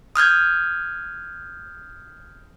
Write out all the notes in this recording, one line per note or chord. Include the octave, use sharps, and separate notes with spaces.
D#6 F6 G6 G#6